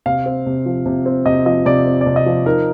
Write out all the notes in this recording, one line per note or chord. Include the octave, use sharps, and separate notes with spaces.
C3 F5
C4
C3
F3
C3
C4
C3 D#5
F3 D#5
C3 D5
C4
D5
C3
D#5
F3
D#4 A#4